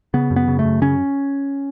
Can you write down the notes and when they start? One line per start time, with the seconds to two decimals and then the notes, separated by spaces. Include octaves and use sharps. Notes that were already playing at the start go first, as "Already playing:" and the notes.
0.14 C#3 B3
0.31 F#2
0.36 B3
0.48 C#3
0.59 A3
0.64 F#2
0.82 C#3 C#4